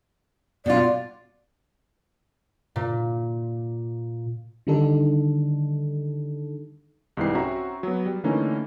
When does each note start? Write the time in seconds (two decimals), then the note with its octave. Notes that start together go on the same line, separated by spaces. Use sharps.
0.66 B2 F4 D5
2.76 A#2
4.67 D3 D#3 G3 D4 D#4 A4
7.17 C2 G#2 E3 C4 C7
7.35 C4 C#4 F#4 E5 A#5
7.83 F#3 B3
8.06 G3
8.24 D3 E3 A3 A#3 C#4 D#4